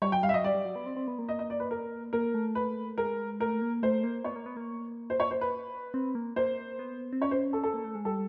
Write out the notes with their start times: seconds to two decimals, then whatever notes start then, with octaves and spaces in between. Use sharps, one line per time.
0.02 G3 C#5
0.12 F#3 G5
0.23 G3 F5
0.29 E5
0.34 F#3 D#5
0.44 G3 D5
0.55 G3
0.65 F#3
0.76 B3
0.86 C4
0.97 C4
1.08 B3
1.19 A#3
1.29 D#5
1.39 D#5
1.50 D5
1.60 B4
1.71 A#4
2.13 A#3 A#4
2.34 A3
2.55 B4
2.98 G#3 A#4
3.40 A3 A#4
3.62 A#3
3.83 A3 C5
4.04 A#3
4.24 B3 C#5
4.36 A#3
4.46 B3
4.57 A#3
5.10 C5
5.20 C#5
5.31 C5
5.41 B4
5.94 C4
6.15 A#3
6.36 A#3 C5
6.79 B3
7.13 C4
7.21 C#4 C#5
7.31 C5
7.53 A4
7.63 A4
7.74 A#3
7.84 A3
7.95 G#3
8.05 G3 A4